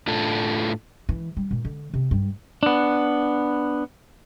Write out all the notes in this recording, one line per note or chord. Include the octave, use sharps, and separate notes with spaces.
A2 D4 F4 A4
E3
G3
A#2
D3
C3
G2
B3 D4